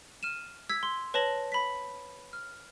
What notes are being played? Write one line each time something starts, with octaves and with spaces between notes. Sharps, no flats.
F6 D#7 E7
E6 G#6 B6
C6
B4 C#5 A5 A#6 F#7
B5 B6
F6